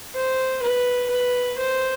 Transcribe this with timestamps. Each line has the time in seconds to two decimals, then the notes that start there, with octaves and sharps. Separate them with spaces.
0.15 C5
0.62 B4
1.10 B4
1.58 C5